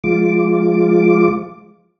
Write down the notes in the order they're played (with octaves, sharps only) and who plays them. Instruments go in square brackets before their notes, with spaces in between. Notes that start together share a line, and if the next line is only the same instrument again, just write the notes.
[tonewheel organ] F3 G#3 F4 D6